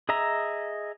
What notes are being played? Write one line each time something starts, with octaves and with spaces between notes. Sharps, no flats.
G#4 D#5 E5 A#5